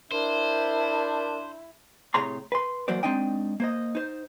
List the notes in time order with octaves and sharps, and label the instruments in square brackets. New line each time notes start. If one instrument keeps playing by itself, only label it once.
[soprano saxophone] D4 [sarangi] E4 [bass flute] A#4 [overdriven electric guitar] C5
[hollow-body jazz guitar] A2 C3 G#4 C#5 A#5 C6
B4 C6
E3 F#3 A#3 F#4 C5 D5
G#3 C4 D4 D#4 D#5 G5
A#3 C5 D#5
D#4 C5